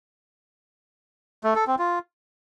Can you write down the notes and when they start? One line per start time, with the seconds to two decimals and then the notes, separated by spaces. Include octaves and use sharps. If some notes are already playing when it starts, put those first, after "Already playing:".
1.44 A3
1.55 A4
1.67 C4
1.79 F4